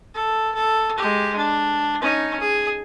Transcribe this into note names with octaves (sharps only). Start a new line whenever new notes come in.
A4
A4
G#3 G4
D4
C#4 D#4
G#4